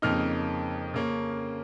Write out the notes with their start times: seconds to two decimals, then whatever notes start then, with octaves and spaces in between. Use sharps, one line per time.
0.02 F2 C#3 A#3 D#4 F6
0.94 C#3 A#3 C#4